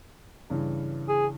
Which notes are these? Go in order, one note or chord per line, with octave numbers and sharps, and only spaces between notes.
G2 C#3 E3
G#4